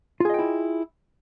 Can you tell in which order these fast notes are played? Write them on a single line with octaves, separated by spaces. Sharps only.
F4 G#4 D#5 G5 E4